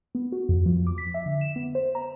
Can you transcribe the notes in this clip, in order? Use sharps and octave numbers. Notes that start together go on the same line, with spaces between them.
B3
F#4
F2
F3
D6
B6
E5
D3
E7
B3
C5
A#5